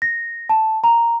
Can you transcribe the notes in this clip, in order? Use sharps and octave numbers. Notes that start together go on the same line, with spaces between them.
A#6
A5
A#5